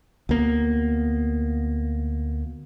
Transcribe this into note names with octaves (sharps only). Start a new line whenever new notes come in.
D2 A#3 B3